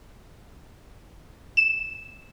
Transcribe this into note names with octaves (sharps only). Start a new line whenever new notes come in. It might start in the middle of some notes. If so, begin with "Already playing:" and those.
E7